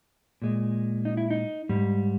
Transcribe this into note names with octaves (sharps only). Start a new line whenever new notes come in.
A#2 G#3
D#4
E4
D#4
G#2 G3